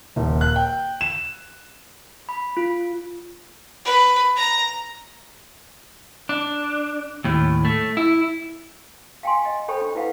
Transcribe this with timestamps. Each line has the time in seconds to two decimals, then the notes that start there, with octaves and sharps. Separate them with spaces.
0.16 D#1
0.41 F#6
0.56 G5
1.01 E7
2.29 B5
2.57 F4
3.85 B4
4.36 A#5
6.29 D4
7.24 D#2 A2
7.65 A3
7.97 E4
9.23 F5 G5 G#5 C6
9.45 D#5
9.68 A4 C5 C#5 G5 B5 C#6
9.81 D4
9.95 E4 B4 F5 F#5